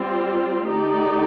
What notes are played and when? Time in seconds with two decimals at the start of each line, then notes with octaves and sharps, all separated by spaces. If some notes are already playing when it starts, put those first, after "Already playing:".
Already playing: G3 C4 F4
0.67 D3 A3 D#4 G4 D5